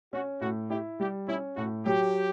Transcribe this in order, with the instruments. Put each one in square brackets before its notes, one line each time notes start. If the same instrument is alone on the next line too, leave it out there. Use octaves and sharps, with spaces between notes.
[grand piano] C#4 [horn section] F#4
[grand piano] A2 [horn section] F#4
[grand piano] E4 [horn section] G4
[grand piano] G3 [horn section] G4
[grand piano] C#4 [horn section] E4
[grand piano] A2 [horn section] F#4
[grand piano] F#3 [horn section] G4